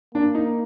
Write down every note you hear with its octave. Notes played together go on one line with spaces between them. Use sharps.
A#3 D4
D#4